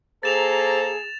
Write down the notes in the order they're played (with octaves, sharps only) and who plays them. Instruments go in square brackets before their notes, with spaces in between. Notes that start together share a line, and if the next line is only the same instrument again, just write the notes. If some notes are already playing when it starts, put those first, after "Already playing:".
[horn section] A#3 A4 A#5 [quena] G#4 [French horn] C5 [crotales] A6 E7 F7